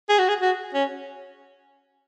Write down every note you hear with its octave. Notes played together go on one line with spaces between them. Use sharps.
G#4
F#4
G#4
F#4
C#4